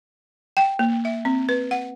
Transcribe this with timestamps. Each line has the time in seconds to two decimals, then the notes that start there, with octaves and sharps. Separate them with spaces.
0.57 G5
0.79 A#3
1.05 E5
1.25 C4
1.49 B4
1.71 F#5